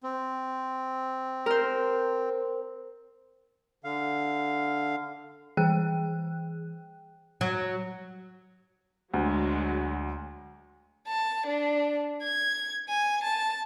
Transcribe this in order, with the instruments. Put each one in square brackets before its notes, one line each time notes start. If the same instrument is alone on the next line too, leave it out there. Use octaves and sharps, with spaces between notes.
[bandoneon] C4
[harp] A#4 C5
[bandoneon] D3 F5
[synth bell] E3 G#4 G5 F#6
[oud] F#3
[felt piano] D2 [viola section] F#3 G#3
[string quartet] A5
D4
G#6
G#5
A5